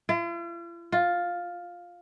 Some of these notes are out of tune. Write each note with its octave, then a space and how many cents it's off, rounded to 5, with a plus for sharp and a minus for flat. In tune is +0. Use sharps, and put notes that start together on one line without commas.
F4 -45
F4 +10